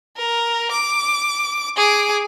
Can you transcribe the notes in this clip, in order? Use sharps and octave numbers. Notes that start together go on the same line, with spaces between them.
A#4
D6
G#4 D6